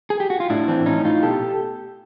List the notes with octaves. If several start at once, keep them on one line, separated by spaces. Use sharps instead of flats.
G#4
G4
F#4
F4
A2 D4 E4
E3 C4 D4
A2 C#4 D#4
A2 D#4 F4
B2 G4 A4